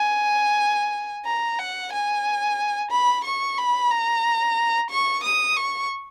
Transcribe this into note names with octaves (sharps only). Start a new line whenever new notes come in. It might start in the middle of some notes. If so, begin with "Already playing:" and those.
Already playing: G#5
A#5
F#5
G#5
B5
C#6
B5
A#5
C#6
D#6
C#6